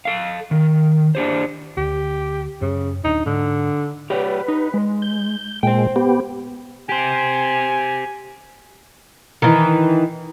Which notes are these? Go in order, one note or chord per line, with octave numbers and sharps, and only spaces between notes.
A4 F5
D#3
D4 G4 C5
D2 G4
F#2 C#3
D1 D4 D#4
G#2 D3
G4 B4 C#5 D5
D#4
G#3
G6
A#2 G#3 C5 G5
B3 G4
G4 C5 G#5
D#3 E3